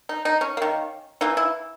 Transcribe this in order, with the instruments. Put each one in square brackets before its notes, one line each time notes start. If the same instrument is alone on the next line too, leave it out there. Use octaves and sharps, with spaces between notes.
[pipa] D#4
D#4
C#4
D#3 A#3
E3 A#3 D#4
E4